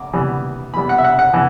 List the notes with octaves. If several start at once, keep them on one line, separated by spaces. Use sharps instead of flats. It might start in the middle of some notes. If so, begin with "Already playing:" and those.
Already playing: D6
E3 G3 B3
E3 G3 B3 B5
F#5
E5
F#5
F#5
E3